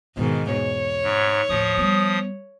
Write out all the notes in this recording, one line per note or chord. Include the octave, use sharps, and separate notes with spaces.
E2 G#2 B2 D#3
C#5
G#2
D#2 A2 F3 D#6
G3 B3